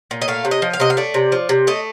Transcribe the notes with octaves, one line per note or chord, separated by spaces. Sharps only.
A#2
D#5
A3 F5
C3
D#5
F3
F5
C3 D#5
F5
A3 D5
C3
F3
C3
A3 D#5